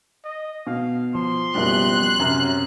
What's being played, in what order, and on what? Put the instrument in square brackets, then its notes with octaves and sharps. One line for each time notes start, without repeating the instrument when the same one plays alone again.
[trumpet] D#5
[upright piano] B2 [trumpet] F5
[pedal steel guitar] F3 [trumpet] C6
[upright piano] F#1 B2 G3 [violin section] F#6
[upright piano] F#2 C3 [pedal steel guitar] F#3 A#5 F6